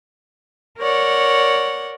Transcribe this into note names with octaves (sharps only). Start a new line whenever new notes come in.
A#4 C#5 D5 F#5